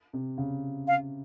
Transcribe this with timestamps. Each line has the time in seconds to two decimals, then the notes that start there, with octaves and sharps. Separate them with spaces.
0.13 C3
0.38 C#3
0.87 F5